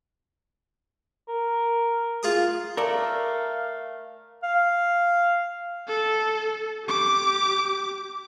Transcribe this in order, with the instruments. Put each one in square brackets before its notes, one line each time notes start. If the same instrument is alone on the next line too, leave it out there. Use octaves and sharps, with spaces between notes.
[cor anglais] A#4
[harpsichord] F4 G#4 D#6
[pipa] A3 A4 D5 [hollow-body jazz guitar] A#4 [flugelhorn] F5
[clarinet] F5
[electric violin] A4
G4 D6